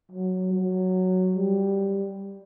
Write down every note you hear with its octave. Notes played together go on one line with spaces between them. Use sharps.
F#3
F#3
G3